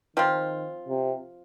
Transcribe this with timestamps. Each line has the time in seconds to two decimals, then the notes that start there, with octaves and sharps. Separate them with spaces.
0.16 D#3 F3 C4 F4
0.88 C3